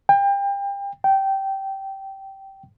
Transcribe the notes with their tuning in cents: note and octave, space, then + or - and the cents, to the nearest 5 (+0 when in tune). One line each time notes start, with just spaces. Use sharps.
G5 +30
G5 -15